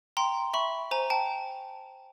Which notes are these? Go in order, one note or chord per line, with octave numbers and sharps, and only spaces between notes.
G5 A#5 C6
E5 B5 C#6
C5 G#5 A#5
G5 A5